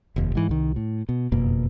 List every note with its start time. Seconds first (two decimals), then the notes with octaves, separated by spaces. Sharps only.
0.16 F1 D#2
0.35 G#2 E3
0.49 C2 D#3
0.76 A2
1.09 B2
1.32 F#1 F2 B2 A#3